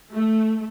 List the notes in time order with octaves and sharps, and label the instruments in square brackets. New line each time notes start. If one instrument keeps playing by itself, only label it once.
[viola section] A3